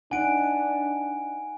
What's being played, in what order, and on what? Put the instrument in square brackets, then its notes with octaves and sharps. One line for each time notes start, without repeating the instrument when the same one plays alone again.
[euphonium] D4 [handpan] D#4 F#5 [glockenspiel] G#5 D7